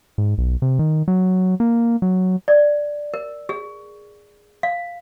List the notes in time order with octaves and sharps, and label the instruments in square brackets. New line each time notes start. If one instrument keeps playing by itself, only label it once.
[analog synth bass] G#2
B1
C3
D#3
F#3
A#3
F#3
[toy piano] D5
A#4
G#4
F5